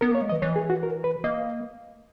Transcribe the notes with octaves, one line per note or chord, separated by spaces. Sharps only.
B3 A#4
A#3 C#5
G#3
E3 D#5
E3 C#5
G#4
F#4
A#4
B4
A#3 D#5